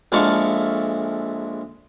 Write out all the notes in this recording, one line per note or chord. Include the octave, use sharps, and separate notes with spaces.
A#1 G#3 E4 A4 F5 C#6